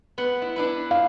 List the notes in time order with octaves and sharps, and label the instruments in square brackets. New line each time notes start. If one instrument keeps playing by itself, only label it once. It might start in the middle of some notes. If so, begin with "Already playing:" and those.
[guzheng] B3 F#5
E4
D4 E4 B4
[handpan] F5